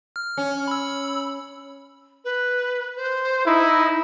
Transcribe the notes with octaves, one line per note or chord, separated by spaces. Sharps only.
F6
C#4
B5 E6
B4
C5
D#4 E4